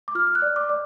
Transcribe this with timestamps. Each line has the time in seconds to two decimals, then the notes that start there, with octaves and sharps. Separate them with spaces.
0.08 D6
0.15 F4 F6
0.27 F6
0.35 F#6
0.42 D5
0.56 D6
0.69 D5